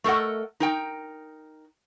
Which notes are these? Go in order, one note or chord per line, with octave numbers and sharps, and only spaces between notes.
A3 A4 A#4 D#5 F#5
D#4 A#4 G5